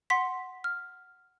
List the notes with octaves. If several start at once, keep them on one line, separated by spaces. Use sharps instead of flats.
F#5 C6 B6
F6